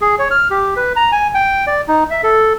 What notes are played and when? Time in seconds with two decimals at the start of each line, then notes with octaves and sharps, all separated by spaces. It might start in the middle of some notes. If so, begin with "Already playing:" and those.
0.01 G#4
0.19 C#5
0.31 F6
0.51 G4
0.77 B4
0.96 A#5
1.12 G#5
1.35 G5
1.67 D5
1.88 D#4
2.10 E5
2.23 A4